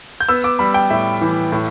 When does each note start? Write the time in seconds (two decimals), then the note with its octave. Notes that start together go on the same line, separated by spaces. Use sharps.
0.20 G6
0.29 B3 E6
0.44 D6
0.59 G3 B5
0.74 G5
0.90 A2 E5
1.21 E3
1.52 A2